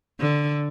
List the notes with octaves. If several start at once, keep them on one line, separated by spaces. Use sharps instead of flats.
D3